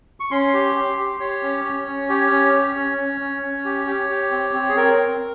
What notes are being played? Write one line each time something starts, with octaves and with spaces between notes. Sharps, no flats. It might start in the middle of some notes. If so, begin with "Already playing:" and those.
C#6
C#4 C6
G4
G4
G4
G4 C#5
C#4
C#4
C#4
G4 C#5
C#4
C#4
C#4
C#4
C#4
C#4
G4
G4
G4
C4
C4
G#4
C4 A#4
C4